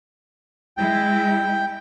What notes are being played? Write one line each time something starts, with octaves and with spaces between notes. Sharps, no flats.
G#3 E4 G5